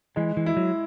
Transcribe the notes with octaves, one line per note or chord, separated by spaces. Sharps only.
E3 G#3
E3
E4
F#3